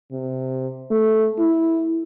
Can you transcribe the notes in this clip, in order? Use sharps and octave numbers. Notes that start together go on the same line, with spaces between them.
C3
A3
E4